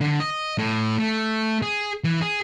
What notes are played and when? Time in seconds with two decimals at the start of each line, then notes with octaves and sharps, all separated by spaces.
0.01 D3
0.20 D#5
0.58 A2
0.99 A3
1.62 G#4
2.04 E3
2.21 G#4